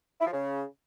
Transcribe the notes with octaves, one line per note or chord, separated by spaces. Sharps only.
E4
F3
C#3